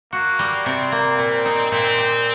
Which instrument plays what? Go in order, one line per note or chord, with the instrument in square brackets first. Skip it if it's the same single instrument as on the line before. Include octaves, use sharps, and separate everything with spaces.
[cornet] A#3 [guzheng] F#4
[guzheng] G3
[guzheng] C3 [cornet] C4
[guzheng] A#3
A#2
D#4
[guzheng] A#2 [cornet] C4
[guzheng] G4